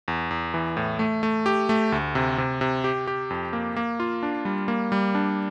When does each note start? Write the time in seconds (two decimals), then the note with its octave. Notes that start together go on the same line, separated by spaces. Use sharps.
0.08 E2
0.31 E2
0.54 E3
0.77 A2
0.99 A3
1.23 A3
1.46 G4
1.69 A3
1.92 D2
2.15 C3
2.38 C3
2.61 C3
2.84 G4
3.07 G4
3.30 F2
3.53 A#3
3.76 A#3
4.00 F4
4.23 D4
4.45 G3
4.68 A#3
4.92 G3
5.15 D4